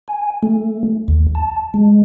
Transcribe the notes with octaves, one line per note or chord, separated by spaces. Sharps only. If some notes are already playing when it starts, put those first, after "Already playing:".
G#5
A3
D#2
A5
G#3